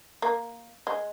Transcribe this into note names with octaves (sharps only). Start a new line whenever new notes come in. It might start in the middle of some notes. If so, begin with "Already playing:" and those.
A#3
G#3